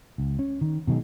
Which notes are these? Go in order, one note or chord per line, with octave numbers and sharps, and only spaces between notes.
C#2
C#4
D#3
B2 D#3 F#3 G#3